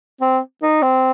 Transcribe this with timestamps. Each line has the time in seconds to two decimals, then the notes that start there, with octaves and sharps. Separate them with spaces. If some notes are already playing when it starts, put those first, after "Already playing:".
0.21 C4
0.62 D#4
0.82 C4